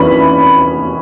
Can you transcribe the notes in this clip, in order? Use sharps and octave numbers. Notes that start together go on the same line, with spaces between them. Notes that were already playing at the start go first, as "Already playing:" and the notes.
Already playing: E3 C#4 B5